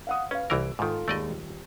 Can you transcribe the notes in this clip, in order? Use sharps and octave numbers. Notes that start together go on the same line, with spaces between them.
F5 F#5 D#6
C#4 B4 F5
C2 E3 A#4 E6 D7
G#2 D#3 F4 A4
D#2 G#3 A3 D5 D#5
D#1